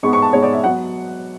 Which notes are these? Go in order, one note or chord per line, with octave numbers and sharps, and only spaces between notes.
G#2 G#3 B3 C#6
C#6
A5
G#2 G#3 B3 C#5
D5
E5
F#3 B3 F#5